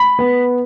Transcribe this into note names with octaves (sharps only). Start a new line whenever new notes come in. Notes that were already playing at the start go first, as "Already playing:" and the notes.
Already playing: B5
B3